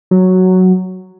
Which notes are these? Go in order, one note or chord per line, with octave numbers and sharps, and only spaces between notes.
F#3